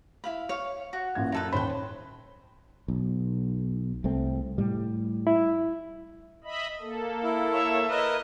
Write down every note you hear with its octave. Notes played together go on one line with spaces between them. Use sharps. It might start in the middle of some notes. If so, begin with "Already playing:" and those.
E4 F5 B5
C#5 F5
F#4
A1 A#2 G#6
F#2 D#4 A4 B4
D#1 C5 C#5 G5 B5
B1
C2 A3 C4
A2 G3
E4
D#5 E5 B5
A#3 A4
E4
C#5 E5
E4 A#4 B4 D#5